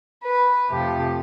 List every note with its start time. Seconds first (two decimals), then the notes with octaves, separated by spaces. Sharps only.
0.22 B4
0.70 F2 C3 F3 A3 G4